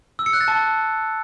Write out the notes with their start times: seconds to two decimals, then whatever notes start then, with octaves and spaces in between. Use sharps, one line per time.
0.19 E6
0.26 C#7
0.33 F#6
0.41 A6
0.48 A5